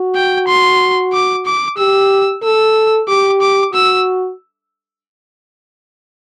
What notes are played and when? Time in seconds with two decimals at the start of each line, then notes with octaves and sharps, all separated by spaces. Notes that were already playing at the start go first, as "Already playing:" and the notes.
Already playing: F#4
0.15 G5
0.48 C6
1.13 D6
1.46 D6
1.78 G4 E6
2.43 A4 E6
3.08 G4 D6
3.41 D6
3.73 F#4 E6